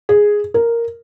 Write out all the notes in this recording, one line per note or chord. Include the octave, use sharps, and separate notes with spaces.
G#4
A#4